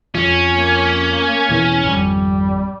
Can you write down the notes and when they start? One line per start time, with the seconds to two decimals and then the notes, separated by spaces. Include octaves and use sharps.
0.15 F2 F3 C#4
0.54 A#3
1.49 E2 B2 E3
1.83 G#1 F2 G3